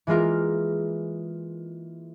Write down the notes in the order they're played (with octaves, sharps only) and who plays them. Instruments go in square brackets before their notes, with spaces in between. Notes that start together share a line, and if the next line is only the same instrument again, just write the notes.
[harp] E3 G#3 A#3 F4 A#4